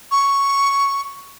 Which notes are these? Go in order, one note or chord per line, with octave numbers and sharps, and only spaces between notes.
C#6